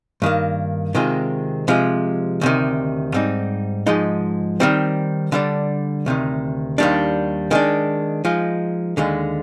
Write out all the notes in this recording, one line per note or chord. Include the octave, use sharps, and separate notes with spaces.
G2 D#3 A#3
C3 D#3 G#3 C4 F4
C3 F3 G#3
D2 C3 D#3
G#2 G3 C4 D#4
G#2 F3 G#3 D#4
D#3 G3 C4
D3 G3 D4
D2 C3 D#3
D#2 D#3 G3 D4
D#3 G#3 D4
F3 G#3 D#4
D#2 D3 G#3